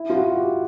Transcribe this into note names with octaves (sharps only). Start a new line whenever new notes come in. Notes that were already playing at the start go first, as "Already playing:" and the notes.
Already playing: E4
F4
F#4
G4